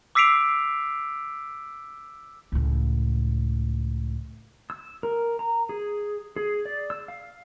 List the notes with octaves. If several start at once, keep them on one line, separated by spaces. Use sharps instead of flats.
D6 E6 B6 C7 D7 F7
C#2 A2
E6
A#4
A#5
G#4
G#4
D5
E6
F5